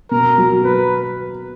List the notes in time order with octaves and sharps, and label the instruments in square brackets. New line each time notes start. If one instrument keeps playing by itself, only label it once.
[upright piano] B2 [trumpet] A#4
[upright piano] F#3
[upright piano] A#3 [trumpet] B4